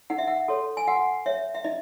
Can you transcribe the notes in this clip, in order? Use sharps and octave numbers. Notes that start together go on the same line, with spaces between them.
D#4 F#5
E5
F#5
F#4 A4 C#5
G#5
F#4 F#5
C#5 E5
E5
D#4 D#5